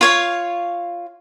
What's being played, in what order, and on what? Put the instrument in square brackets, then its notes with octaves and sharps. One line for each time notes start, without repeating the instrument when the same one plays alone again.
[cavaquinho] F4 C#5 F5